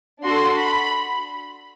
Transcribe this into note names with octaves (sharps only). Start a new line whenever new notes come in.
D4 F#4 A4 C6
B5